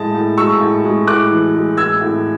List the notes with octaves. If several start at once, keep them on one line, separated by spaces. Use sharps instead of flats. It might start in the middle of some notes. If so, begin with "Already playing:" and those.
Already playing: A2 G#3 A5
A2
G#3 C#6 E6
A2
G#3
A2 D6 F#6
E3
G#3
A2 E6 G#6
A2